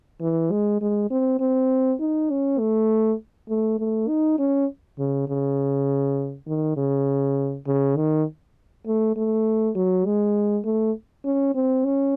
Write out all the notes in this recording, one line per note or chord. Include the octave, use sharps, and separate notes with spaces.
E3
G#3
G#3
C4
C4
D#4
C#4
A3
A3
A3
D#4
C#4
C#3
C#3
D#3
C#3
C#3
D#3
A3
A3
F#3
G#3
A3
C#4
C4
C#4